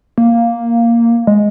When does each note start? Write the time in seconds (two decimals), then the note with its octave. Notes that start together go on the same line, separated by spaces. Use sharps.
0.18 A#3
1.27 G#3